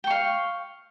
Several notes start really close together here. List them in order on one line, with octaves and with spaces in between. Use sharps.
G5 C#6 F5